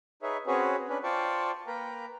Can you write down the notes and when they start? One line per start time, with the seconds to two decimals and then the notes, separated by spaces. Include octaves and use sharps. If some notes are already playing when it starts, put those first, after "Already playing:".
0.23 D#4 G#4 B4 C#5 E5
0.47 C4 C#4 F#4 G#4 B4 C#5
0.89 C#4 D4 B4
1.04 F4 C5 D5 G5 A5 C#6
1.67 A#3 A#4 B4 G5 A#5